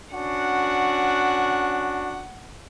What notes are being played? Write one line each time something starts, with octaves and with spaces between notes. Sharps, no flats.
C#4 D4 F#4 F#5